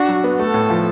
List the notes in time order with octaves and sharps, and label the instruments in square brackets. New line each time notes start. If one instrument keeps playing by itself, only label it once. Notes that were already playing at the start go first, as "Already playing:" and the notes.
Already playing: [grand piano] D4 [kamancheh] F#4
[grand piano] F#3
B3
[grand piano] A3 [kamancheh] A4
[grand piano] A2
F3